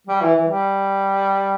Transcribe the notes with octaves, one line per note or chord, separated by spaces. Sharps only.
G3
E3
E3
G3